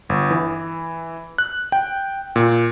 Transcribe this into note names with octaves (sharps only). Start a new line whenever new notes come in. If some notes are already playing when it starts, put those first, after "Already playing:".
G1
E3
F#6
G5
A#2